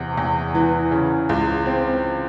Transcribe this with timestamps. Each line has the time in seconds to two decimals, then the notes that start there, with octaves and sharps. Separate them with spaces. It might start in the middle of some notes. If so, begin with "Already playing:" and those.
Already playing: E2 C3
0.17 E2
0.55 E3
0.91 C#3
1.29 C#2
1.66 C4